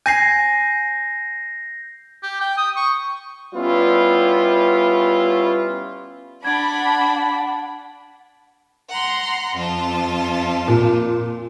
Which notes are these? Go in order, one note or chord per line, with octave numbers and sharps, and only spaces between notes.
G#5 G6 A#6 C7
G4
G5
D#6
C#6
G3 B3 C#4 E4 F4
D4 F#5 B5 G#6
F#5 A#5 C6
F2 F4 A5
A#2